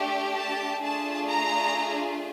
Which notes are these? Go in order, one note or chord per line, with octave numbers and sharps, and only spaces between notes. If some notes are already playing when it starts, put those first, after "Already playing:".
Already playing: A3 D4 G4
A5
A3 D4 F4 G#4 A5
A#5